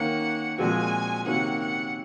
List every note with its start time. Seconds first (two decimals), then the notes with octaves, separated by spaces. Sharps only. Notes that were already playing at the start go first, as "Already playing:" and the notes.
Already playing: D#3 A#3 C#4 F#5
0.58 A#2 F3 G#3 C4 F#4 G#5
1.25 C3 D#3 A#3 C#4 F#4 F#5
1.60 F#5